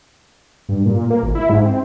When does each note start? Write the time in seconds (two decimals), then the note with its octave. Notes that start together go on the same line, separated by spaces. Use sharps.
0.69 G2
0.86 A#2
1.10 A#3
1.23 G#1
1.35 E4
1.49 G#2
1.65 C4